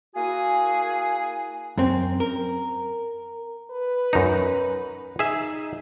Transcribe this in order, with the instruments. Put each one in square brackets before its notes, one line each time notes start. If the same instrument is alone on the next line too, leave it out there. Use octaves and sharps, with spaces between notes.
[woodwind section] A#3 E4 F#4 G#4 G#5
[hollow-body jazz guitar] F#2 C4
A#4
[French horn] B4
[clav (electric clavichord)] F#2 D#4
[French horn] D#4 [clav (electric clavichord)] G#4 E5